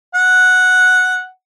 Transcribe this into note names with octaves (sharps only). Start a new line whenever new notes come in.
F#5